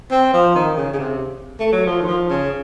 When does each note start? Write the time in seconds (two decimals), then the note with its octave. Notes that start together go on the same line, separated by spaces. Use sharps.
0.11 C4
0.33 F3
0.55 D#3
0.77 C#3
0.94 C#3
0.99 C3
1.60 A3
1.72 F#3
1.86 F3
2.01 D#3
2.08 F3
2.30 C#3